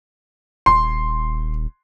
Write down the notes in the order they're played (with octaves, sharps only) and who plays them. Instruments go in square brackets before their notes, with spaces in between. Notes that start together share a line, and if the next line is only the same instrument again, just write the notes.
[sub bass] D#1 [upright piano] C6